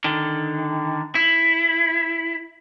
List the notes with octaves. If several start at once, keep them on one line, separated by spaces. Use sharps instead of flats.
D3 D#3
E4